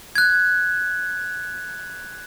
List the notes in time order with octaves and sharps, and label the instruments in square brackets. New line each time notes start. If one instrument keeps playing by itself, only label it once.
[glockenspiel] F#6 G#6